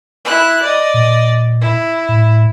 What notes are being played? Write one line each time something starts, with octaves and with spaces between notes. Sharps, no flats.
E4 F#6
D5 D#5
A#2
E4
A2